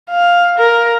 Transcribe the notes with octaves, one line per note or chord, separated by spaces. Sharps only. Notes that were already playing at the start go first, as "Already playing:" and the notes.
F5
A#4